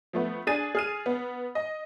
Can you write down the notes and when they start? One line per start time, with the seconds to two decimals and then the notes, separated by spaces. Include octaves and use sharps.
0.13 F3 A3 B3
0.47 D4 G#4 G#5 A6 D#7
0.75 G#4 F6 D#7
1.06 B3
1.55 D#5